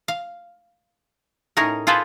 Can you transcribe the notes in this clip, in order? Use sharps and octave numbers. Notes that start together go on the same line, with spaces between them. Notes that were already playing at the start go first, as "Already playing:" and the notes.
F5
A2 C#4 D#4 G#4 A#4
F4 G#4 A4 B4 C5